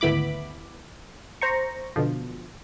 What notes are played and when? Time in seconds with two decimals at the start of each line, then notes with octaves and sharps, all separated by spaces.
0.01 G#1 D2 B3 E4 B5 D6
1.41 C5 A#5 C#6
1.96 B2 D3 F3